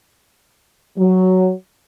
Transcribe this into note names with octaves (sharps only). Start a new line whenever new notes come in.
F#3